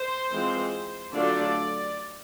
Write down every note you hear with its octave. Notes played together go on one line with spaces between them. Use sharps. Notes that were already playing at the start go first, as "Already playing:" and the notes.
Already playing: C5
E3 G#3 C4 F4
D3 F#3 A3 D4 F4 D5